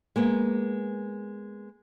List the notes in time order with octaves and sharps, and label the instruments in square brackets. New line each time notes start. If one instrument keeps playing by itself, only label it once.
[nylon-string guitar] G#3 A#3 B3